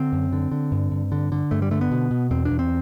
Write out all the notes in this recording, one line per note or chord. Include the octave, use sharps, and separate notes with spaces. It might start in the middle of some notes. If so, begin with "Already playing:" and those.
Already playing: D3 C4
F#2
D3
D3
G2
G2
D3
D3
G2 A3
G3
D3 A3
B3
B2
B2
E2 C4
D4
E2
C4